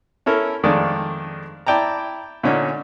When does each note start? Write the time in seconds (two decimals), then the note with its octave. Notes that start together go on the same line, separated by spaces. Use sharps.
0.26 C#4 E4 A4 A#4
0.64 F2 D#3 G#3 A3 D4 D5
1.67 E4 D5 G5 A5 A#5
2.43 A#2 D3 C#4 D#4